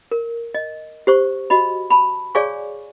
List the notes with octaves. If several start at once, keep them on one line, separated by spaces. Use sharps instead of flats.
A#4
D#5
G4 C5 C#6
F#4 D#5 B5
A5 B5
G#4 C#5 D5 F5 G#5 C#6